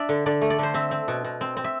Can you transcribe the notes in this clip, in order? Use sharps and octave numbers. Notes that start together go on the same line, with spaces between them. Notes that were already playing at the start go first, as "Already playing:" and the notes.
Already playing: D4 D5 E5
D3
D3 D5
A3
D5
D3 C5
C4 E5
C4
B2
B2
C4
C4
E5